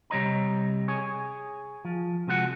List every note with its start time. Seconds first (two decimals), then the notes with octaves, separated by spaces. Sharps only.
0.10 C3 G3 C#5 D#5 A#5
0.88 G#4 C#5
1.85 F3
2.27 C3 F3 G#3 F#4 A4 F#5